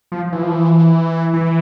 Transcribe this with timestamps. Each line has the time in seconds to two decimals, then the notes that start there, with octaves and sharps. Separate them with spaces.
0.12 F3
0.32 E3
0.43 F3
0.52 E3
1.34 E3